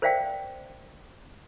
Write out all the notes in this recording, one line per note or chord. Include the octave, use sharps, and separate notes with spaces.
A#4 C5 D5 E5 F5 G5